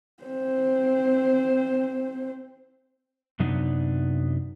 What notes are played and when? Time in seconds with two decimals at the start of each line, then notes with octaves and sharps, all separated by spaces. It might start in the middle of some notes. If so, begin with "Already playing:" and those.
0.24 C4 C5
3.40 F#2 C3 F#3 B3 D4 D#4